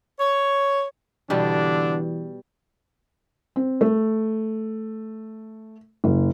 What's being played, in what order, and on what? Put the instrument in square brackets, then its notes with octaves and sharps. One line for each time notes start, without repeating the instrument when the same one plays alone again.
[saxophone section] C#5
[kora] B2 G3 [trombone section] D3 D4 [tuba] E3
[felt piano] C4
A3
F#1